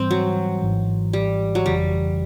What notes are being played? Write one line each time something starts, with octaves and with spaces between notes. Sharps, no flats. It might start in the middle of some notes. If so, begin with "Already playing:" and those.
Already playing: G#2 E3 G3 C4
F#3
G#1 G#2 E3
G3
F#3
G1 F2 C#3 E3 G3